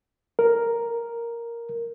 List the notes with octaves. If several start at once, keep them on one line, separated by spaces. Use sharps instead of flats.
A#4